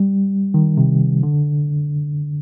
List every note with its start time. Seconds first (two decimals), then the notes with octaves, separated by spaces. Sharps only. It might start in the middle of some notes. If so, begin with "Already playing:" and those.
Already playing: G3
0.54 D#3
0.78 C3
1.23 D3